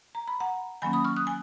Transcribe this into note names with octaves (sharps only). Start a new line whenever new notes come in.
A#5
B5
F#5 A#5
D#3 F#3 A#3 C#4 G#5 B5
B5 D#6
C#6 F6
D#6 F#6
G#5